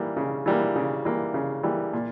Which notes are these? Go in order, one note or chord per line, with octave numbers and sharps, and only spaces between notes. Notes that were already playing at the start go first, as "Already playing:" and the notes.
Already playing: E3 G3 A#3
C#3
E3 G3 A#3
C#3
E3 G3 A#3
C#3
E3 G3 A#3
A#2